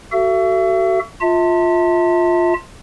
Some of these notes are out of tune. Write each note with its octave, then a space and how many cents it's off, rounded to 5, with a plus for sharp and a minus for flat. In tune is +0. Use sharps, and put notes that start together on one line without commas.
F#4 +30 A4 +15 E5 +40
F4 +5 E5 -30 A5 +35